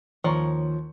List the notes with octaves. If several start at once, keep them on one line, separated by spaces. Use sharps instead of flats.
D#2 F3 C#5 A#5 C#6